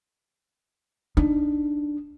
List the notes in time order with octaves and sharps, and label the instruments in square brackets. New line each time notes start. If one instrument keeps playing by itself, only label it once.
[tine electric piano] D4 [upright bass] D#4